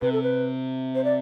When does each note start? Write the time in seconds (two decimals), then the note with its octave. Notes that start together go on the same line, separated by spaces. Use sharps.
0.02 C3 B4
0.12 A4
0.23 B4
0.95 C5
1.04 D5